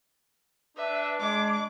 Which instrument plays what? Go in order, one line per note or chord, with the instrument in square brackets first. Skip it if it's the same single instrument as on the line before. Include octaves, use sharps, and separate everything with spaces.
[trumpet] D4 [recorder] B4 [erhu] E5
[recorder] G#3 [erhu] D6